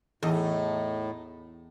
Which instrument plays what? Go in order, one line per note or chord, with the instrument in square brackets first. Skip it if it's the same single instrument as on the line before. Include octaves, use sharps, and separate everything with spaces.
[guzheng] E2 [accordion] A2 [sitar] A3 D#4 D#5